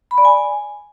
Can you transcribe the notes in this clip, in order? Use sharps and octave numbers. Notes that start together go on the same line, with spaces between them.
B5
D5
G#5